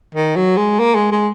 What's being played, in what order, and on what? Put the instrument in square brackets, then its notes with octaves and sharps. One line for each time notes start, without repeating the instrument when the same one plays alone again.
[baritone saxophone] D#3
F#3
G#3
A#3
G#3
G#3